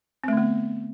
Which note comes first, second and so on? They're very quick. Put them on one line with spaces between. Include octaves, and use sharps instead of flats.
C4 A3 D3 B3